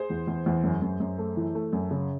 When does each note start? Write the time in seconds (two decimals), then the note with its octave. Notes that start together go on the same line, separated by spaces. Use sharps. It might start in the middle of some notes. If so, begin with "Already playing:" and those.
Already playing: G#4 C5
0.10 E2
0.27 E2
0.46 E2
0.64 F#2
0.82 F#2
1.00 F#2
1.18 A3
1.37 E3
1.55 A3
1.73 F#2
1.91 C#3